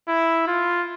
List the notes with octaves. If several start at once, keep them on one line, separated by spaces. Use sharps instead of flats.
E4
F4